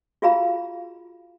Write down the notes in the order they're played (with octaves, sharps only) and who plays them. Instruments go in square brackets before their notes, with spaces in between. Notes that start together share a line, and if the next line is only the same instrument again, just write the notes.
[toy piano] F4 F#4 G#4 F5 A#5 B5